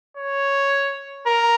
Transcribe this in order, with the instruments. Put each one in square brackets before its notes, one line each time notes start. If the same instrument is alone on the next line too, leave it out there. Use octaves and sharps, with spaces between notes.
[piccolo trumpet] C#5
A#4